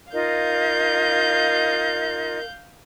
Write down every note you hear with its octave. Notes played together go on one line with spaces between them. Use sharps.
D#4 F4 A#4 D#5 F5 G6